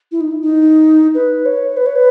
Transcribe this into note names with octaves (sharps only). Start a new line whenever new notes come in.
E4
D#4
E4
D#4
B4
C#5
B4
C#5
B4